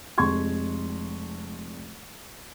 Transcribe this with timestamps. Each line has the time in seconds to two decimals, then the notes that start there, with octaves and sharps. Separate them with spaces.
0.18 F1 F2 G#3 C6 C#6 G#6